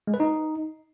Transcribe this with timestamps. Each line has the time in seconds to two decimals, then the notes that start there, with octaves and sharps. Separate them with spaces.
0.07 G#3
0.14 B4
0.20 D#4